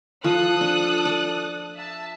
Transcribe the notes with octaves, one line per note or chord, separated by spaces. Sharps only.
F3 A4 D#6 F#6
D4
D5
E5 A5